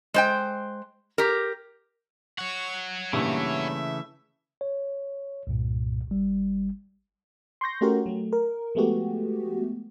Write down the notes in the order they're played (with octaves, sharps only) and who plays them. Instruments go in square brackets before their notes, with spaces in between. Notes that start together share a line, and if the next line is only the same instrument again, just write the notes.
[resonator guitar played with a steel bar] G#3 C5 G5
G4 A#4
[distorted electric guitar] C#5 F#5 [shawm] C#6
[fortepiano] G2 A#2 A#3 [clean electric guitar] C#3 E3 A3 [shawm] E5
[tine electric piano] C#5
C2 G2 A#2
G#1 G3
[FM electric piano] C6 C#6 G6 A#6
A3 C#4 F#4 G4 A#4
F#3 A3
A#4
F3 G#3 A3 B3 F#4 G4